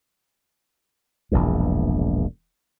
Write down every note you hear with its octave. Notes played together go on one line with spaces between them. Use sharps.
E1 A#1 E2 G2